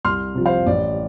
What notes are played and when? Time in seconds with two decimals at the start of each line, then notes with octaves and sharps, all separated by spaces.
0.05 C2 C6 F6
0.35 C3 F3
0.46 C5 F5
0.67 A1 D5